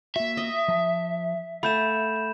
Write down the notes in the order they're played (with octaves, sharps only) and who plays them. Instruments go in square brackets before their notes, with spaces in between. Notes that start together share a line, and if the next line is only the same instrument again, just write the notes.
[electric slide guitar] A#3 F#4 [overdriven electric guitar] E5
[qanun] D#5
[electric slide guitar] F3 A5
[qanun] A3 [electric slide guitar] F5 F#5 G#5 [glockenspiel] B5 G6 E7